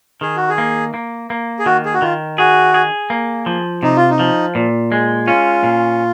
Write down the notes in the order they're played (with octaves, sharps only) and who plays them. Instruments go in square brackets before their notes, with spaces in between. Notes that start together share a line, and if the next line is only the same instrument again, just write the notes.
[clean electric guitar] D#3 [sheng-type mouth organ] G#4
[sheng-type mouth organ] F#4
G#4
[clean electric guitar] A#3
A#3
A#3
[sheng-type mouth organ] G#4
[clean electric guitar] D#3 [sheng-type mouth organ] F#4
[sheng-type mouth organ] G#4
F#4
[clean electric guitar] D#3 [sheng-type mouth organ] F4
[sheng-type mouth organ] F#4 [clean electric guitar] G#4
[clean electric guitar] G#4
A#3
F3
[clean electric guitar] C3 [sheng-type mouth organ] D#4
[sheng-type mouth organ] F4
D#4
[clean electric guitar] F3
A#2
G#3
[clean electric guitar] C#4 [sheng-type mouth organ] F4
[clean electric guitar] A#2